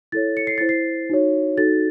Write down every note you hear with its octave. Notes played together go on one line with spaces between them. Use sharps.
E4 A4 C#5 A6
C#7
C7
E4 C5 A6
C7
D#4 F#4 C#5
D#4 F#4 A4 A6